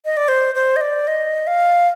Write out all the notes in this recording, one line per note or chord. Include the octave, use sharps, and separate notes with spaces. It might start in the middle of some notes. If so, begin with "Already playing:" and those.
D#5
D5
C5
C5
D#5
D5
D#5
F5